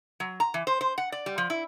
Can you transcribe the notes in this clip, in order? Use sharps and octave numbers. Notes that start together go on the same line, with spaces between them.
F#3
A#5
E3
C5
C5
F#5
D5
G3
F3
E4